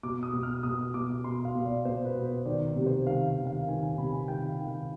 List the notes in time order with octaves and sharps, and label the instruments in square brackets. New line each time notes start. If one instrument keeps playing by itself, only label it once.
[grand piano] B2 D6
D#6
B2
F6
B2 D#6
B2 D6
B2 C6
F5
B2
D5
B2 C5
B4
B2
C5
D#3 D5
C3
C5
D#3 F5
F5
D#3
F5
D#3 G#5
G#5
C3 B5
G#5
D#3 G5
F5
D#3
G5